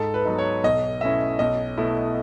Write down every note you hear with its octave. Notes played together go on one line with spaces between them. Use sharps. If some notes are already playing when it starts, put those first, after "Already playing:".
Already playing: G#2 A4
B4
F#3 B3 D#4
C#5
B1 D#5
B2 A3 C#4 E4 E5
B1 D#5
B2 A3 E4